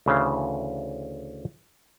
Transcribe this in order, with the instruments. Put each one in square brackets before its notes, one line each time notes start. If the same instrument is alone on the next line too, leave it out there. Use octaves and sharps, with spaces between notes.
[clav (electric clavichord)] D2 C#3 E3 F5